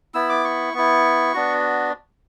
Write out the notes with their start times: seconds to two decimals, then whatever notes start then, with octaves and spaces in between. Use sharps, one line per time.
0.14 B3 E4 E6
0.29 D6
0.44 C#6
0.74 B3 E4
1.33 B3 D4 F#4